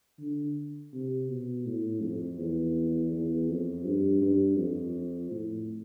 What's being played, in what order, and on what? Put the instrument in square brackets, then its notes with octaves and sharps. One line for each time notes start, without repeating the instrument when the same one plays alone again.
[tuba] D3
C3
B2
A2
F2
E2
E2
F2
G2
G2
F2
A2